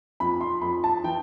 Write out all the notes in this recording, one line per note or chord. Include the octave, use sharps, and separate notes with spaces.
F2 B5
C6
F2 B5
A5
E3 G5